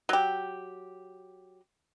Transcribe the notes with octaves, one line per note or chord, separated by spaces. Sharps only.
F#3 G4